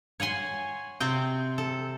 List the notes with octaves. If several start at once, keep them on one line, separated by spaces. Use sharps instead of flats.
C#5 F#5 G#5 C6
C3 C4 G5
A4